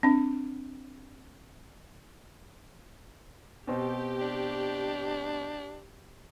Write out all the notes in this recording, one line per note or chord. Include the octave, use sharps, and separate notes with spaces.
C4 D4
B2 C4 G4
D4